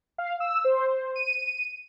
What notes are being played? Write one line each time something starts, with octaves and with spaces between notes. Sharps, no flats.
F5
E6
C5
D#7